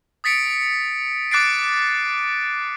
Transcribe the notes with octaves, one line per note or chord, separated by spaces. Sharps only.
D#6 A6 B6 C#7 D7
D6 F#6 A6 C7 D7